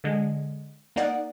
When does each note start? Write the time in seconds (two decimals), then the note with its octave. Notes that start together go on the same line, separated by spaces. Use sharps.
0.04 D3 G#3
0.96 A#3 D#4 D5 F#5